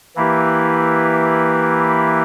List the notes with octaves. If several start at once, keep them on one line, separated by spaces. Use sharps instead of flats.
E3 A#3 E4 G4 B4